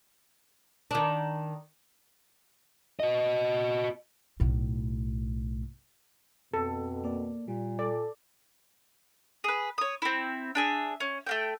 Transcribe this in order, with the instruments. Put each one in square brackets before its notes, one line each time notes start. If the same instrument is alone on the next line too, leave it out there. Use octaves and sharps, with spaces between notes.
[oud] D#3 D4
[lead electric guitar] F#4 D#5
[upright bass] B1 A2
[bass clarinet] F2 [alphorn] B2 [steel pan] A4
[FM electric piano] A#3 D5
[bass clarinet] A#2 [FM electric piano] G3
[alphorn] A4 [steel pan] D5
[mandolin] G#4 B4
C#5 D#6
C4 E4
D4 G#4 E5
C#4
A3 A#3 G5